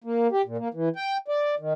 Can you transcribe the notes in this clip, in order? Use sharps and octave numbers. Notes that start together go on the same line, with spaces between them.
A#3
G4
A#2
A#3
E3
G5
D5
D#3